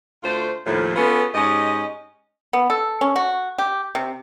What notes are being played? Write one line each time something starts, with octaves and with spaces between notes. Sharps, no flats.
D2 A3 F4 C5
D#2 A2 F3
B3 C#4 F4 G#4 A4 B4
G#2 C#4 G4 D#5
B3
A4
C#4
F#4
G4
C3